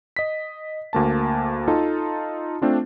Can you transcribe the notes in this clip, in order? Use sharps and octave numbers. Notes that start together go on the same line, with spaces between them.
D#5 B6
D2 A#3 A5
D#4 F4 A4 A5
A3 C4 D4 F4